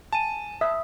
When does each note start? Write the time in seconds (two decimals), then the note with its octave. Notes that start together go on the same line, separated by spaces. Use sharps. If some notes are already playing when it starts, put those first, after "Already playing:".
0.13 G#5 A5 D#7
0.61 E5 D#6